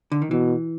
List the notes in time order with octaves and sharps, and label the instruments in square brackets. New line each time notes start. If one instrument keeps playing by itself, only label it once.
[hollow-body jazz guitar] D3
D#3
[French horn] B2 [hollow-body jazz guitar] E3